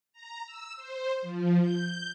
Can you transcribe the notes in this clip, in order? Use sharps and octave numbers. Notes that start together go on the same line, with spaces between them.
A#5
E6
C5
F3
G6